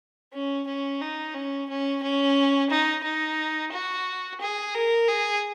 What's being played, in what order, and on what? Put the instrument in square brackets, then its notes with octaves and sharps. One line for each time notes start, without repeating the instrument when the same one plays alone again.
[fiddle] C#4
C#4
D#4
C#4
C#4
C#4
D#4
D#4
F#4
G#4
A#4
G#4